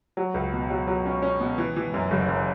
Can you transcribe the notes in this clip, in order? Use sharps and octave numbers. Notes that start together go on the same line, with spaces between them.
F#3
C#2
B2
F#3
F#3
C#4
C#4
B2
E3
E3
F#2
F#1
F#2